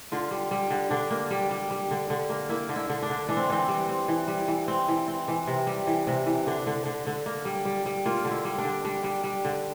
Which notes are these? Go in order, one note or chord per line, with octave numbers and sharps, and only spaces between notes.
D3 F4
G3
G3
D3
D3 D4
A#3
G3
G3
G3
D3
D3
A#3
A#3 E4
D3
E4
D3
D4
D3
E3 D4
C4
E3 C4
G3
C4
E3
G3
E3
C4
E3
C4
E3
C3
G3
E3
C3
E3
D3 D4
D3
D3
D3
A#3
G3
G3
G3
A#3 F4
D3
E4
G3
D4
D3
G3 D4
G3
G3
D3